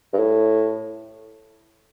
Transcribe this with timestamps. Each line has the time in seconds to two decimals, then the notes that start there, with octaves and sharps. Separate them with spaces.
0.13 G2
0.19 A2